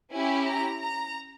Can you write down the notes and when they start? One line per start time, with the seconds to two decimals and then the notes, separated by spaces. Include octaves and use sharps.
0.12 C#4 E4 G4 G#5
0.47 A#5
0.81 A#5